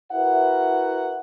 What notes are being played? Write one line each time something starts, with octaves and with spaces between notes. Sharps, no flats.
E4 F#4 A#4 B4 E5 F#5